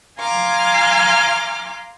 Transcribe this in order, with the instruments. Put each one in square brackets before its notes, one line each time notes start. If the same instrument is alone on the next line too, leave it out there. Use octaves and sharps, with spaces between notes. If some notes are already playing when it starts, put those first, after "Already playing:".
[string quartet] F5 G#5 A#5 C6 D6 F6